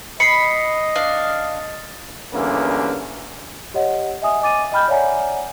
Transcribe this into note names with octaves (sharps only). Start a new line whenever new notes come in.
D#5 B5 C7 C#7
D4 F5
E2 G2 D3 A#3 C#4
G4 C#5 D#5 F#5
D#5 E5 G#5 D#6
D#5 G#5 D6 A6 D#7
D#5 G5 B5 F6 G6
C#5 D5 E5 F#5 G#5 A#5